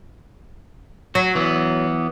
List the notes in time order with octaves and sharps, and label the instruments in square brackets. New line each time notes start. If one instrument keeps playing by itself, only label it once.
[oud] F#3 [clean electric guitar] F#4
[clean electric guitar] E3 B3